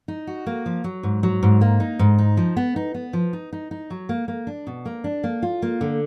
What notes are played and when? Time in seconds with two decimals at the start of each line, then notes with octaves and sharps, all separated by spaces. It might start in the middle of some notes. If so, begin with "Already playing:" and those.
0.08 D#4
0.27 F#4
0.46 A#3
0.66 F3
0.84 F#3
1.03 G#2
1.23 F#3
1.43 G#2
1.61 A#3
1.80 D#4
1.99 G#2
2.18 D#4
2.37 F3
2.57 B3
2.76 D#4
2.94 B3
3.13 F3
3.33 D#4
3.53 D#4
3.71 D#4
3.90 F#3
4.09 A#3
4.28 A#3
4.47 D4
4.67 B2
4.85 A#3
5.04 D4
5.24 A#3
5.42 F4
5.62 A#3
5.81 D3